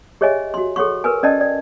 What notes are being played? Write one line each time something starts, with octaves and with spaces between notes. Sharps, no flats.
G4 G#4 C#5 D#5 E5 G#5
F#4 C6
G#4 A4 C#5 F#5 C6 C#6
A#4 B4 G#5
C#4 D5 D#5 G5 A5
D5